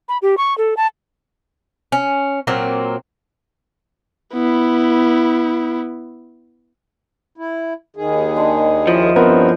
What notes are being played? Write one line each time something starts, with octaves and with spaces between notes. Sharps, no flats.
B5
G4
C#6
A4
A5
C#4
A#2 F#3 A#3 C4
B3 E4
E4
D#2 D#3 G#4
G#3 D4 G5
F3 E4 C#5 D#5
G2 B3 C4 A#4